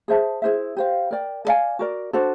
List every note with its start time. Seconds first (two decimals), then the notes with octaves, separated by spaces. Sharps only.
0.08 G#4 C5 E5 A5
0.42 E4 G#4 C5 E5
0.77 G4 C5 F5
1.11 A#4 D5 G5
1.45 A4 D5 F5 G#5
1.79 F#4 A#4 D5
2.13 D4 F#4 A4 C5